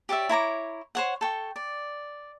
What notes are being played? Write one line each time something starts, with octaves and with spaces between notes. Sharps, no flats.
G4 C#5 D5 E5
E4 C#5 A#5 D6
C5 C#5 F#5
A4 G5 C#6
D5